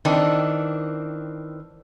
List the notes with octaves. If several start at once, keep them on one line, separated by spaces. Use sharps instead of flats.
D#3 E3 C4 D4